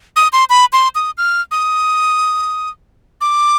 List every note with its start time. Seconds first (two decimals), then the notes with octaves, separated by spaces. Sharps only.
0.16 D#6
0.33 C6
0.50 B5
0.73 C6
0.95 D#6
1.18 F6
1.51 D#6
3.21 D6